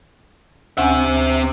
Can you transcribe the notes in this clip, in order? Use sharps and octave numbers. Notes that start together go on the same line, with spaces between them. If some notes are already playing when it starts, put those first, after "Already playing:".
D2 C4 C#4 E5 G#5